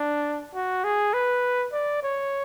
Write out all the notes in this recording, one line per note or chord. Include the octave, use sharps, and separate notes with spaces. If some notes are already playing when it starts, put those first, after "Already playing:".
Already playing: D4
F#4
G#4
B4
D5
C#5